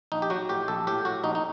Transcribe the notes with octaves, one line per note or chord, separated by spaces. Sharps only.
A#1 D#4
G4
F#3 F#4
A2 G4
A#1 A4
A2 G4
A2 F#4
A#1 D#4
D#4